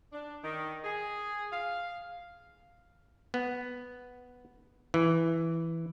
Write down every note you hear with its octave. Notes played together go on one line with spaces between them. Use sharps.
D4
D#3
G#4
F5
B3
E3